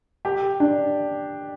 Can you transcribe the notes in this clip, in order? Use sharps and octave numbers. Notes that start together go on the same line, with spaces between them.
G4
D4